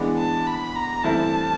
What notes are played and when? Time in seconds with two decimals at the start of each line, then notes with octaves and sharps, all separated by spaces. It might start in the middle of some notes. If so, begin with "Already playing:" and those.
Already playing: E3 G#3 B3 D4
0.18 A5
0.47 B5
0.75 A#5
1.04 G2 E3 A3 C4 E4 A5